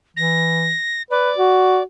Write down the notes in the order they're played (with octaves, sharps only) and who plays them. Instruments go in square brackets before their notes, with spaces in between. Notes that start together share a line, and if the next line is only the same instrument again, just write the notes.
[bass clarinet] E3 [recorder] A#6
[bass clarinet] B4 [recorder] D5
[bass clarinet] F#4